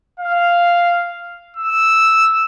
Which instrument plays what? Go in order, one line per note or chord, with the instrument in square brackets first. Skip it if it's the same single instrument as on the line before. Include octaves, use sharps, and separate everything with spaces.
[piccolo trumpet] F5
E6